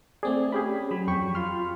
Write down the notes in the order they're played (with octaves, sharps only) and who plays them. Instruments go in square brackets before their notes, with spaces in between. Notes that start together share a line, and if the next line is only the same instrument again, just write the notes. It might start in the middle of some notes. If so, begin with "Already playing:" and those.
[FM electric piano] A3 C4 D5 [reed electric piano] G#4
[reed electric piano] C#4 G4 G#4 [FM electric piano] B5
[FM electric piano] F#3 B5
[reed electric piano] F2 G5 C#6
F4 C6 F6